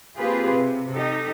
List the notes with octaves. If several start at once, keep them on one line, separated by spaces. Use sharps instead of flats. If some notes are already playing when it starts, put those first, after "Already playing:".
A#3 C4 F4 G4 G#4 B4
C3
D#4 G4 A4